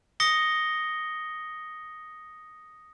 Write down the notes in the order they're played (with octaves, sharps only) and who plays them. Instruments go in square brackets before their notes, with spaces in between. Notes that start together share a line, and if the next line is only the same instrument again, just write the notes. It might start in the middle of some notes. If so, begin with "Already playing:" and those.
[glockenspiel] D#6 A#6 C#7 G7